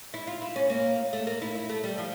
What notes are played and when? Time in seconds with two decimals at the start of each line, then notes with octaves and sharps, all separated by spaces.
0.14 E4
0.27 F4
0.42 E4
0.56 C#4
0.70 A#3
1.13 A3
1.27 A#3
1.42 E4
1.55 E4
1.69 A3
1.84 G3
1.98 F3